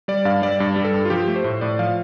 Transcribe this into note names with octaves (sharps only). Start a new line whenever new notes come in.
G3 D5
G2 F5
G3 D5
G2 D5
G3
A4
G2
F4
F3 G4
A3
C5
A2
A2 D5
F3 F5